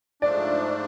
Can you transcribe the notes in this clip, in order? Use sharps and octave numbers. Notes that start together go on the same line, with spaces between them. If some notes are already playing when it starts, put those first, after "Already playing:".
G#2 F3 A3 D4 D5